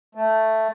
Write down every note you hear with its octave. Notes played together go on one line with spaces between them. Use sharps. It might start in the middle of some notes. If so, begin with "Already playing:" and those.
A3